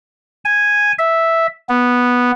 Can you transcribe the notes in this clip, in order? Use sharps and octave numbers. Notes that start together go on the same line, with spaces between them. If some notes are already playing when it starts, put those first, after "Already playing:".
G#5
E5
B3